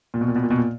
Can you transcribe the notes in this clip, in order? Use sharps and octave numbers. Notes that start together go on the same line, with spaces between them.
A#2
B2
A#2
B2
A#2
B2
A#2